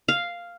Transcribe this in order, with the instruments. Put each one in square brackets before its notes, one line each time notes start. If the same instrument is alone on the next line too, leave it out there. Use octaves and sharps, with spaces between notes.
[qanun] F5